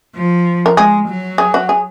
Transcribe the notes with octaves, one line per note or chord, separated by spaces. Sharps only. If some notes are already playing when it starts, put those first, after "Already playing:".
F3
A#4
G#3 G#4
F#3
G#4
F#4
G#4